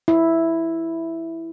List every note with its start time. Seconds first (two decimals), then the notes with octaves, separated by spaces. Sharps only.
0.08 E4